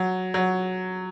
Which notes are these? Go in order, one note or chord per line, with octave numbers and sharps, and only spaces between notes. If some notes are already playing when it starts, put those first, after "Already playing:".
Already playing: F#3
F#3